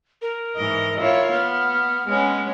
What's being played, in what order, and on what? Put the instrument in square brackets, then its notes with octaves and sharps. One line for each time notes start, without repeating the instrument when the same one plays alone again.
[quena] A#4
[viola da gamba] G#2 E3 D#5
E4 F4 C#5
[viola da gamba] B3 [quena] F6
[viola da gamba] G#3 B3 C#4